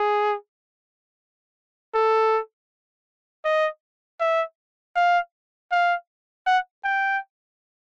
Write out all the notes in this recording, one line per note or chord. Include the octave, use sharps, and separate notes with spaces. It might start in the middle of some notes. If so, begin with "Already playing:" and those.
Already playing: G#4
A4
D#5
E5
F5
F5
F#5
G5